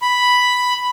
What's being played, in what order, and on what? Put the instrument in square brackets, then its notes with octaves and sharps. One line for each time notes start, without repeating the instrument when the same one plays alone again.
[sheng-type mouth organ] B5